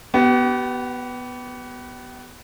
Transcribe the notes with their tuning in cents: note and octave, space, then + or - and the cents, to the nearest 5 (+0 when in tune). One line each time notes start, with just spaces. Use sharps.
B3 +0 G4 -40